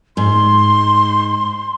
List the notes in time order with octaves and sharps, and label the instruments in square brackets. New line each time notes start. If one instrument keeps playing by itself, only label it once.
[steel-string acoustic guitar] G#2 [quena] C6